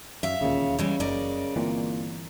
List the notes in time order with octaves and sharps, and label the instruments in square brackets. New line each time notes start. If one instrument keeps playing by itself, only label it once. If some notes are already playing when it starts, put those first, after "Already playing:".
[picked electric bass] F#2 [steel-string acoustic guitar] E5 F5
[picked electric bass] E1 D#2 A#2 [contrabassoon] C#3
[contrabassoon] C#3 [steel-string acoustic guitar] E3 G3 G#3
[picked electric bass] F#1 [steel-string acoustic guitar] A#4 D5 D#5
[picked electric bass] G1 E3 C4 [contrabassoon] A#2